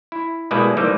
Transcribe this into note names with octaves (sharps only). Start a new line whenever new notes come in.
E4
B2 G3 G#3 A#3 E4 B4
E3 G3 A3 A#3 C4 D#4